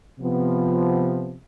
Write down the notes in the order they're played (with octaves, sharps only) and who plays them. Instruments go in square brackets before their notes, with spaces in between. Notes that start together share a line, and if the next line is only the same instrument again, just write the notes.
[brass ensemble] C3 F3 B3